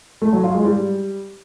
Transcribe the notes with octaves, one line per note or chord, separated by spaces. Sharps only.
A3
F#3
F4
G#3
G3